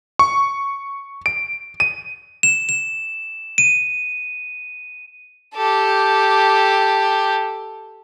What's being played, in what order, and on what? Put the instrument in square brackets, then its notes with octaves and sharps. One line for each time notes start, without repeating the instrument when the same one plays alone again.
[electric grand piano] C#6
D7
D#7
[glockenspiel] E7
E7
D#7
[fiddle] G4 A4